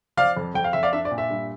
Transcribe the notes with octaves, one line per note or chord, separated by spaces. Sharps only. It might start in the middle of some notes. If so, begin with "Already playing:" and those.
F3 D5 F5
F2
F2 G5
F5
F2 E5
D5 F5
D4 E5
D5
A#2
E5
G2